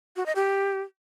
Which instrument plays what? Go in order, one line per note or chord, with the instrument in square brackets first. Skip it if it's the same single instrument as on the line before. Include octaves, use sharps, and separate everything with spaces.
[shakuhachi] F#4
D#5
G4